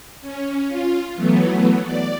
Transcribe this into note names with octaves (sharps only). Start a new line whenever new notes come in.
C#4
F4
E3 F#3 A3 B3
D5